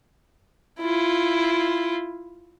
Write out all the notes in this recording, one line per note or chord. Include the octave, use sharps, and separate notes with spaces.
E4 F4